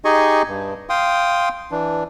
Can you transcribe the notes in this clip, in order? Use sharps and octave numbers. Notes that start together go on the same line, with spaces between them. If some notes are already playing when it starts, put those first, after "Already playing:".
D#4 G4 G#4 D#5 G#5 C#6
G2
F5 G5 C6 D#6
E3 D4